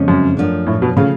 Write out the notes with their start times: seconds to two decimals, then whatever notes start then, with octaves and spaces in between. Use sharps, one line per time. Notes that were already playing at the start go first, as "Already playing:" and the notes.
Already playing: F2 C#3 G#3 C#4
0.08 F#2
0.37 F#2 F3 A3 D4
0.67 A2
0.82 B2
0.97 C#3 F3 A3 F4 G#4